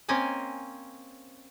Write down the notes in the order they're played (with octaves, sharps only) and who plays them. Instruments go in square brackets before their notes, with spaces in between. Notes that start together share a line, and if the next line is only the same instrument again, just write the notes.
[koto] A#3 C4 C#4 D#5 G#5